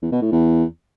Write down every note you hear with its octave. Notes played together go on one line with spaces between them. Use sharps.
E2
B2
A2
E2